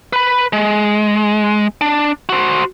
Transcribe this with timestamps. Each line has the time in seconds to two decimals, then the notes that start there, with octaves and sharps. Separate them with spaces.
0.13 B4 B5
0.53 G#3
1.81 D4
2.29 F#4 C5